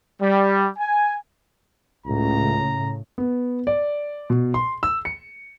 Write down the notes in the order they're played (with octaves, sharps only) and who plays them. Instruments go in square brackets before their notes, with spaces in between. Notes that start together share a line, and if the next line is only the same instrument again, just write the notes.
[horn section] G3
G#5
[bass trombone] C#2 [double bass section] A2 C#3 [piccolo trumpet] A#5
[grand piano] B3
D5
B2
C6
E6
C#7